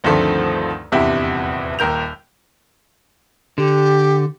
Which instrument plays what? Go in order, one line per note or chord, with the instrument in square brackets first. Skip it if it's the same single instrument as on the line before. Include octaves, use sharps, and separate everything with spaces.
[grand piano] D2 G2 D#3 F3 A3 C4
D#1 E2 G2 C3 E4 G4
D#1 D#2 A#4 G6 F7
[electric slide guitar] D3 [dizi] G4